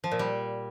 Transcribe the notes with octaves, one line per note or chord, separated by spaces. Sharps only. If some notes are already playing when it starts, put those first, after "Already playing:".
F3
A#2
G3